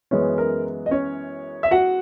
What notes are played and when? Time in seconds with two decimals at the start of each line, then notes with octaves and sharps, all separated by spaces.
0.11 F#2 E3 G#3 B3 C#4 C#5
0.38 A#4
0.86 D#5
0.91 C#4 C#5
1.63 E5
1.71 F#4 F#5